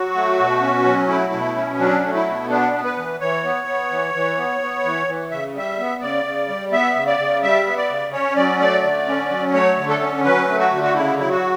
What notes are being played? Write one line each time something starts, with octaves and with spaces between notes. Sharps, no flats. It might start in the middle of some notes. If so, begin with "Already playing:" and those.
Already playing: F#3 F#4
A3
B2
C#4
F#3
A3 E4
B2
C#4
F#3 D4
A3
E4
B2
B3 D4
B3
B4
E3
E3 C#5
B3
B3
E3
E3
B3
B3
E3
E3
C#3 E5
G3 E5
B3
C#3 D5
C#3
G3
B3 E5
C#3
D5
C#3
G3 E5
B3
D5
C#3
C#4 C#5
F#3 D5
A3 D5
D3
C#4
F#3
A3 C#5
D3
A4
C#4
F#3 B4
A3
F#4
D3
F#4
C#3 E4
F#3 E4
F#4